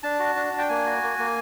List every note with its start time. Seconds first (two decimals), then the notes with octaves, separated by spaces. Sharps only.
0.03 D4 A5
0.19 F#4
0.36 D4
0.53 D4 G5
0.69 A#3 G#5
0.86 F#4
1.03 A#3
1.19 A#3